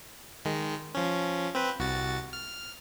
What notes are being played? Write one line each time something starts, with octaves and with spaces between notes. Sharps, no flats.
D#3 G#3
F3 C#4
C4 B4
C2 F#4 A6
F6